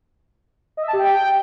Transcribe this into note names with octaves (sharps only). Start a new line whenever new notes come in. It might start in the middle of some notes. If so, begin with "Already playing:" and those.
D#5
E5
A5
G4
G5